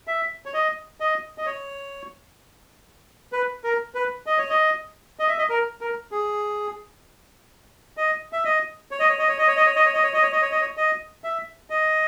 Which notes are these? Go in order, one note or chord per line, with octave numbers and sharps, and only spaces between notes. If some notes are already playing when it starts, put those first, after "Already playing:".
E5
C#5
D#5
D#5
D#5
C#5
B4
A#4
B4
D#5
C#5
D#5
D#5
E5
D#5
A#4
A#4
G#4
D#5
E5
D#5
C#5
D#5
C#5
D#5
C#5
D#5
C#5
D#5
C#5
D#5
C#5
D#5
C#5
D#5
C#5
D#5
C#5
D#5
C#5
D#5
E5
D#5